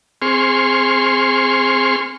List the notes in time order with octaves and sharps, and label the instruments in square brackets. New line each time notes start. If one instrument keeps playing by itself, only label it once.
[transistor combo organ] C4 G#4 C6 C#6 F6